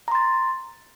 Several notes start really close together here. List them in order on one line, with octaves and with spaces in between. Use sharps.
A#5 C6 A6